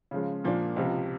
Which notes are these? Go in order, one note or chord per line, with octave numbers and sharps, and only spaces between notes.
C#3 F3 G#3
A#2 F3 A#3 D4
C#2 C3 F3